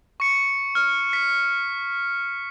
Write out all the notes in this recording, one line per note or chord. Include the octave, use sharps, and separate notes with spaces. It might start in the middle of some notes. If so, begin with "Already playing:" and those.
C#6 C#7
F6
B6